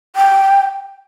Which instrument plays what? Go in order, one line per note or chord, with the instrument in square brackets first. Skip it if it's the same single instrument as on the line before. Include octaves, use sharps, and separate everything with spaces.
[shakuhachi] G5